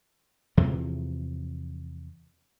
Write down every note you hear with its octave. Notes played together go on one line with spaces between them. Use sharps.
E2 C3 E3 F3